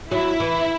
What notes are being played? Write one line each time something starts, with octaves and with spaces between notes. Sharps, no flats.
F#3 E4
E3